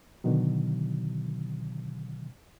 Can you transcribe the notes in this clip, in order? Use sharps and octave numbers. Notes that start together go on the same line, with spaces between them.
B2 D3 D#3 F#3